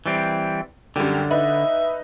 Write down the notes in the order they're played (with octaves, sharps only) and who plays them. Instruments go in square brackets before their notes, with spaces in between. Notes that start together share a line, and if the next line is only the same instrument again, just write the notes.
[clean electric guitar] E3 G3 C4
[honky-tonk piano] F#2 G3 G4 [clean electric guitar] D3
[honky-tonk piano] D#4 B4 [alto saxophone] E5